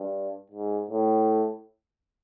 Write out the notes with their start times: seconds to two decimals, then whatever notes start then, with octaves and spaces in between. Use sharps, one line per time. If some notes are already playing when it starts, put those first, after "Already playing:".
Already playing: G2
0.52 G#2
0.90 A2